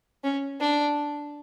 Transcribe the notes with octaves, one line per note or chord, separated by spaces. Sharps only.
C#4
D4